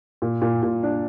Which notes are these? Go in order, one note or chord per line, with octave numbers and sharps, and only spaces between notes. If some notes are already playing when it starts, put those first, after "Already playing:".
A#2
A#2
A#2
D4